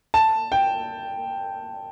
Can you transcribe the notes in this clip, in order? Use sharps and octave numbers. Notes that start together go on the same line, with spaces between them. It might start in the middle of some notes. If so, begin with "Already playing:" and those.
A5
G5